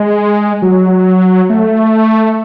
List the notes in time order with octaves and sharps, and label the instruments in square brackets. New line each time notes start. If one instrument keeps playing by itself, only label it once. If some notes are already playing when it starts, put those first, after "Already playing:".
Already playing: [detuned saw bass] G#3
F#3
A3